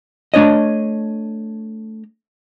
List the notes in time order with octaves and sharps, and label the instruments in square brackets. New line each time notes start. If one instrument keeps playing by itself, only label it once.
[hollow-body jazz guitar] A3 D4 C#5 D#5